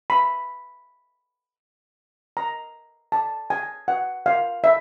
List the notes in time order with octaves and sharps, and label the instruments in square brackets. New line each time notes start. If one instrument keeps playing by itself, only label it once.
[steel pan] B5
A#5
A5
G#5
F#5
F5
E5